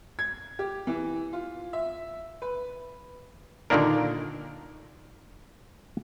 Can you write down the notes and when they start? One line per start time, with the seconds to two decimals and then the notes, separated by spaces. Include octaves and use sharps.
0.19 G#6
0.59 G4
0.87 E3
1.33 F4
1.73 E5
2.42 B4
3.70 A#2 D3 D#3 A#3 D4 A#4